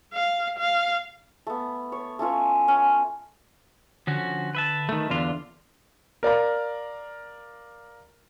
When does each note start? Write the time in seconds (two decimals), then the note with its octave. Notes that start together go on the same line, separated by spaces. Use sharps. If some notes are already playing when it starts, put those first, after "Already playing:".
0.13 F5
0.59 F5
1.47 A3 B3
1.92 C#5
2.19 A3 C#4 F4 C#5
2.68 C#4
4.07 D3 F3 C#4 F#4
4.55 B4 E5 A5
4.89 D#3 A3
5.10 E2 D3 F4
6.23 A#4 D5 F5 A#5